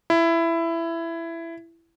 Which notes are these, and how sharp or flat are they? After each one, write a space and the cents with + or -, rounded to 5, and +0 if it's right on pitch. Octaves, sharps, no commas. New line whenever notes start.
E4 +15